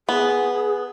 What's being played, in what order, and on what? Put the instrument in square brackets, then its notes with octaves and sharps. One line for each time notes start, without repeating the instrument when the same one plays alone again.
[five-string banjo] B3 [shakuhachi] G#4